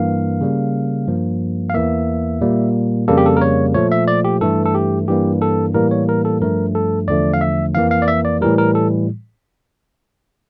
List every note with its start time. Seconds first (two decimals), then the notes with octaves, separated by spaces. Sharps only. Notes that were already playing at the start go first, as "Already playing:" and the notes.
Already playing: G2 E3 A#3 F5
0.41 C#3 G3 A#3
1.08 G2 F3 A#3
1.70 F5
1.74 E2 E3 A#3 E5
2.41 A#2 G3 A#3
3.08 F2 C#3 G3 A#3 A4
3.18 G4
3.26 A4
3.37 A#4
3.41 C#5
3.74 A#2 F3 A3 C#5
3.92 E5
4.08 D5
4.25 G4
4.41 G2 E3 A3 A4
4.65 A4
4.75 G4
5.08 G2 E3 G3 A#3 G4
5.42 A4
5.74 A2 E3 G3 A#3 A#4
5.91 C#5
6.09 A#4
6.25 A4
6.41 G2 F3 A3 A#4
6.75 A4
7.08 E2 D3 F3 A3 D5
7.34 F5
7.41 E5
7.75 F2 E3 A#3 F5
7.91 F5
8.02 D5
8.08 E5
8.25 D5
8.41 A2 E3 G3 A#4
8.58 A#4
8.75 A4